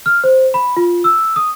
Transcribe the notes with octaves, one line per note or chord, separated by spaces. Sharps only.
F6
C5
B5
F4
E6
D#6